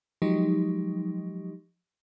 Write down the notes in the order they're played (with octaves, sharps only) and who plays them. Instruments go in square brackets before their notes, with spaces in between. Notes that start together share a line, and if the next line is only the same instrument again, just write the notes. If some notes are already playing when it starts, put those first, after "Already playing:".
[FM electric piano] F3 F#3 G#3 D#4 G4